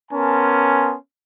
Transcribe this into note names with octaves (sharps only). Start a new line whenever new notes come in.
B3 C#4 A#4 G#5 A5 C6